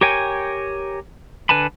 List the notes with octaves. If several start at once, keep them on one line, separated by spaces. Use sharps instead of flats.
G4 A#4 C#5 G5 G#5
D3 B4 G#5 A5 B5